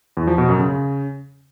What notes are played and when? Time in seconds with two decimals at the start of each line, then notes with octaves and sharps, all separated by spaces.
0.17 E2
0.27 F3
0.38 B2
0.49 F#2
0.59 C#3